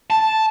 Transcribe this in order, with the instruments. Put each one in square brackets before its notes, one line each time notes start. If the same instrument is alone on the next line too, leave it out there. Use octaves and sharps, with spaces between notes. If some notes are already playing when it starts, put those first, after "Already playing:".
[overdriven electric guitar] A5